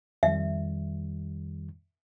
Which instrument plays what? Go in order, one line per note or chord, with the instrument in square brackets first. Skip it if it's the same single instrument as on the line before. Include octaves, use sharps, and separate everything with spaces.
[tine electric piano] F2 D#3 G3 [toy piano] E5